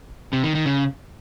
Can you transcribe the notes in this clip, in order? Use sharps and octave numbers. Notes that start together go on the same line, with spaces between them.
C3
D#3
D#3
C#3